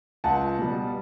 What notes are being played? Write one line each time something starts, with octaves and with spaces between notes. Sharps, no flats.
C#2 F#5 A5
B2 G3